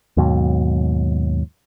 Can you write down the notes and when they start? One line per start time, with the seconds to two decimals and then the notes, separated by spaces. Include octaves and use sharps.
0.17 D#2 G#2 B2 F#3